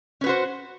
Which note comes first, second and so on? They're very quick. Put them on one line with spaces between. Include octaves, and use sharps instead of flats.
C#4 B4 F#4 C5